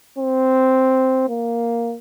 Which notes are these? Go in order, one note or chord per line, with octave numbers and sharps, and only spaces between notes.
C4
A#3